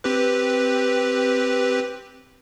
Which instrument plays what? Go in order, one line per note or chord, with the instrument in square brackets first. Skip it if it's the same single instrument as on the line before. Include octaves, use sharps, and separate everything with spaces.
[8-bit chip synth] C4 G4 B4